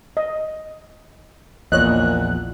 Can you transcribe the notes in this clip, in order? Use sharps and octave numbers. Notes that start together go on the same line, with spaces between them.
D#5
A#1 E2 A#2 C#5 D#5 F#6